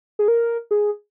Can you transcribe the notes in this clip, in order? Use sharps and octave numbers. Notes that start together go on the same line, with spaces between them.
G#4
A#4
G#4